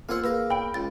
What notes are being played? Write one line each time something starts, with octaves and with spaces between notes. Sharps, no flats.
A#3 F4 C5 F#5 G#5 E6 F6
A#3 G#4 A#4 B4 F5 E6
G5 B5 D7
C#2 A6